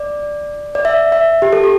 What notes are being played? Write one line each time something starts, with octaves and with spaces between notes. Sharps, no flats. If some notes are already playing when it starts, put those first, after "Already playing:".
Already playing: D5
D5
E5
E5
G4
A4
G4